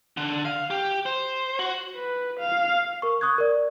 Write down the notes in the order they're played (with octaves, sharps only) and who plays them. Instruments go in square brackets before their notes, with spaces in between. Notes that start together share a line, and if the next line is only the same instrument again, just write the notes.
[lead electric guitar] D3
F5
G4
C5
F#4
[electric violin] B4
F5
[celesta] A#4 C#6
C#6 D#6 F#6 G#6
A#4 D5